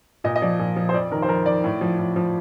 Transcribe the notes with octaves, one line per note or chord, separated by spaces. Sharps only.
A#2 D#5
D#5
F3 D5
A#2
F3
C5
F2 D5
D#3 A#4
C5
F2 A#4
D#3 D5
A2
F3
A2
F3